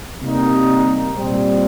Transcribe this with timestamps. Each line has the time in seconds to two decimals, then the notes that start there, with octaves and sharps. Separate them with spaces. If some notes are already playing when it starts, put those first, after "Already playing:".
0.21 C3 G3 A#3 D#4
1.14 A#2 G3 C4